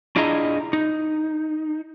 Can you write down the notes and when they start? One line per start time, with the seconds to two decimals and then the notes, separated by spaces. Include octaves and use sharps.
0.16 D4 E4 F4 G#4 D#5 A#5
0.73 D#4